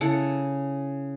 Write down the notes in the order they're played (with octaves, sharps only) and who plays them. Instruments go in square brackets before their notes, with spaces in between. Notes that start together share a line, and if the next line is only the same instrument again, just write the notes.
[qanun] C#3 E4 A4 F#5